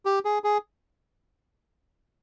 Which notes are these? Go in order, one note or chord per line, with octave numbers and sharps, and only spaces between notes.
G4
G#4
G#4